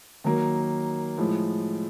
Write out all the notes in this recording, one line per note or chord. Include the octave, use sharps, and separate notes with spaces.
D#3 F#3 A#3
A2 F3 G#3